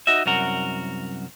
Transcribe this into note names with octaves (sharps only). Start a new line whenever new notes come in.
D#4 F#4 D#5 E5
C2 F#2 F#4 A#4 F#5